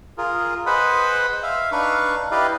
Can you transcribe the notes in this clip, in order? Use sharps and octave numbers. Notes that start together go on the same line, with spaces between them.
F4 G#4 A#4
G#4 B4 C5 D#5 F#5 B5
E5 F5
D4 D#4 B4 F5 C#6
E4 G4 B4 D5 D#5 F5